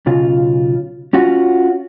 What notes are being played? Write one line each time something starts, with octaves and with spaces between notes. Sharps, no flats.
B1 C#3 F4
C#4 F4 F#4